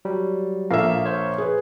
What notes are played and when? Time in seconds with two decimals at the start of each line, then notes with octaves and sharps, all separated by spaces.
0.05 F#3 G3
0.71 A#1 A#3 A4 E5 F5
1.06 C5 C#5
1.38 G#4 B4